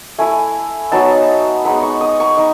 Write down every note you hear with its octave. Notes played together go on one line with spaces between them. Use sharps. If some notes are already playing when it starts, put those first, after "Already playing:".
A3 E4 G#5
F#3 B3 D#4 A5
G#3 B3 D#4 B5
C#6
D#6
C#6
D#4